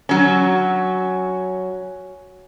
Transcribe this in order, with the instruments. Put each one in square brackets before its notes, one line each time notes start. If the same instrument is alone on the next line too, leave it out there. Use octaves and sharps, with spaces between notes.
[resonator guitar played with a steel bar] F#3 C#4